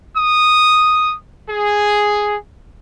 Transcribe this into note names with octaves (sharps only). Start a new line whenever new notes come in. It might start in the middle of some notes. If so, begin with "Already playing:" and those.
D#6
G#4